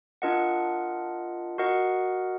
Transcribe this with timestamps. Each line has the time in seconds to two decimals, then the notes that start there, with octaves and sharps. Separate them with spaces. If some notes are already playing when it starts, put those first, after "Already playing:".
0.22 D4 F4 A#4 D#5 F#5
1.58 F#4 A#4 D#5 F#5